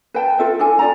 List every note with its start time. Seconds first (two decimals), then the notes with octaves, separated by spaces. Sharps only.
0.14 B4 G5 A5
0.39 F4 A4 E5
0.59 D4 E4 A4 G#5
0.79 F4 D5 A#5